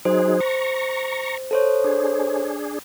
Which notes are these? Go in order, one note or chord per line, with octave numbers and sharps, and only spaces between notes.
F#3 D#4 G#4 C5
A#5 C#6
A4 C5 C#5
D4 G#4